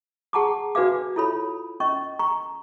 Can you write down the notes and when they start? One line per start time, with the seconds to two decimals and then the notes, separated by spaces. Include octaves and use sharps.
0.33 G#4 F#5 A5 A#5 C#6 D6
0.75 D4 F#4 B4 D5 F5 D6
1.16 E4 F4 A4 C#5 B5
1.80 C#4 D#5 C#6
2.19 A#5 C#6